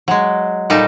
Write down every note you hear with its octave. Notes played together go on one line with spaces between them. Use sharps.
F#3 G#3
A#2 G3 D#4 A4